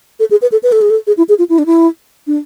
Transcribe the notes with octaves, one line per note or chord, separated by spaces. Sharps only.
A4
G#4
B4
A4
B4
A4
G#4
A4
G#4
E4
G#4
F4
E4
D4
E4
D4